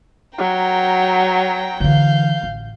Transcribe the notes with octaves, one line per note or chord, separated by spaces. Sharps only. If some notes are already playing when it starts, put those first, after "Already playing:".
F#3 G5 A#5
D3 E3 F5 G6
A1